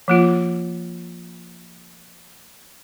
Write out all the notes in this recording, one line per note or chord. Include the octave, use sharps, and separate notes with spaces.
F3 A#3 F4